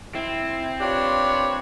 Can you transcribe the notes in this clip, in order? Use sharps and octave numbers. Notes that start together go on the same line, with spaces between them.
C4 E4
D4 F4 G4 B4 C#5